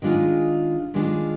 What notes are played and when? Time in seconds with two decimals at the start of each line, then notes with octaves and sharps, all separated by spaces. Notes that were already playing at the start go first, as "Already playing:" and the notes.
0.02 D#3 G#3 D4 F4 G#4
0.94 D#3 G#3 D4 F4 G#4